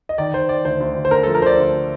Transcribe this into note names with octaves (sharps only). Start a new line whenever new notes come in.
D#5
D#3 D5
D#3 C5
D#3 D5
D2 C5
D2
D2
C5
D3 A#4
F3 A4
A#4
D2 C5 D5
D2